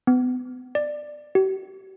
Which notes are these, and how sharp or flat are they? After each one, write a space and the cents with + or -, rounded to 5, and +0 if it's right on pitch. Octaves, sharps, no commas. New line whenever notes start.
B3 +30
D5 +15
G4 -45